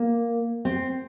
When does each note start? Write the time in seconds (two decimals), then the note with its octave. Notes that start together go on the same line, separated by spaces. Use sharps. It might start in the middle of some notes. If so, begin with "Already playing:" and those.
Already playing: A#3
0.65 C4